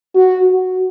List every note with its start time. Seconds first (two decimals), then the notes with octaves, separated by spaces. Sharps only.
0.15 F#4
0.50 F#4